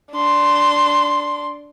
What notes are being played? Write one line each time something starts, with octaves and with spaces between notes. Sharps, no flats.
D4 C6